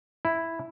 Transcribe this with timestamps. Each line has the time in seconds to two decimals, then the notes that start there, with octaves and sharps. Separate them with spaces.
0.25 E4